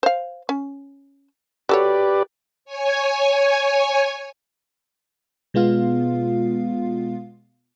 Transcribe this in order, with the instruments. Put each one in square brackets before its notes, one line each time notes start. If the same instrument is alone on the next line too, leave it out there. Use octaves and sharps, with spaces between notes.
[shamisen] C5 F5
C#4
[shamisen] F#4 A4 C#5 [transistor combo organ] G4 B4 D5
[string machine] C#5 G#5
[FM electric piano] B2 G#3 B3 F4 F5